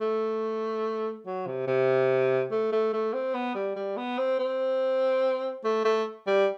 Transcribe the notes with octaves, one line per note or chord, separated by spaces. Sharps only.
A3
F#3
C3
C3
A3
A3
A3
C4
B3
G3
G3
B3
C4
C4
A3
A3
G3